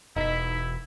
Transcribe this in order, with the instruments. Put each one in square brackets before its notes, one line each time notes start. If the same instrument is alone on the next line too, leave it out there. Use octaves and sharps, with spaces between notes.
[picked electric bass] E1 [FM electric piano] D#4 B6 [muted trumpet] E4